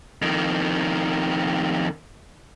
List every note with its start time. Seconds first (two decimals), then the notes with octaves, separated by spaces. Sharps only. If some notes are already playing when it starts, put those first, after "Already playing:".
0.22 F2 D#3